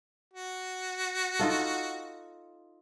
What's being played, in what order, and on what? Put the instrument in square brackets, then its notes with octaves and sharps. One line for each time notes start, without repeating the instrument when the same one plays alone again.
[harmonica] F#4
[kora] D#4 F4 A4